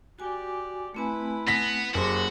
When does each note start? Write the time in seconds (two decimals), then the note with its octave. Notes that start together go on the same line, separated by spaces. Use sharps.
0.19 F#4 G4 D5 G#5
0.94 A3 C4 E4 B4 G#5
1.47 B3 A#6 B6
1.94 F#1 A#3 F#4 G4 C5 D6